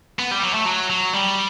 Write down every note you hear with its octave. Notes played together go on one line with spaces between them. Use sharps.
B3
G3
F#3
A3
F#3
F#3
G3